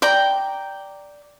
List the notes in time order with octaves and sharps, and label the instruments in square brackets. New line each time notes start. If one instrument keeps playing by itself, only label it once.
[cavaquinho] D5 G5 A#5